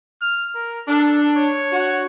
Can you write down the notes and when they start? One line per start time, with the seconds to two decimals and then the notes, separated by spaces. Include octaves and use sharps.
0.21 F6
0.55 A#4
0.88 D4 A4
1.38 C#5
1.73 F#4